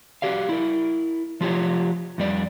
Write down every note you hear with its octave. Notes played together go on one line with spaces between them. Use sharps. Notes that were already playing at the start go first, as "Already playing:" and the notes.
F#4 G4 D5 F5
E4 A#4
F3 F4 G4 C#5
F2 G3 D5